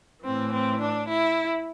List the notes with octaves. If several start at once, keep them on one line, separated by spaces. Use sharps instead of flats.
A2 E3 C4
C4
D4
E4